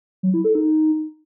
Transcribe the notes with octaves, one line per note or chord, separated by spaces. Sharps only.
F#3
E4
A4
D#4